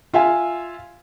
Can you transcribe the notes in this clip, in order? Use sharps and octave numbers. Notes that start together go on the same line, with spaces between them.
F4 E5 F5 G#5